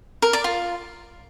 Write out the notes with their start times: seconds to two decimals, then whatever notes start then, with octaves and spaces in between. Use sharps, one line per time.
0.22 A#4
0.33 D5
0.44 F4